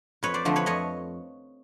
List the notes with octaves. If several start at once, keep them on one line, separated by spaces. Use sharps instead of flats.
F2 B4 C#5
C5 D5
D3 F3 A3
B4 C#5
F2 C#5 D#5